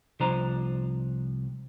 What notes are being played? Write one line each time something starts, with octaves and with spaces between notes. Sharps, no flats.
C2 F3 D4 C5 A#5